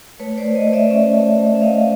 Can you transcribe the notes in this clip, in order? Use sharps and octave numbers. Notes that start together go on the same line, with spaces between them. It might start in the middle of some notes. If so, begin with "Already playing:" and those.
A3 B4 C#5
C5 D5
A3
C#5 D#5
A3
D5 E5
C#4 D5 E5
A3
A3
E5
A3 D#5 F5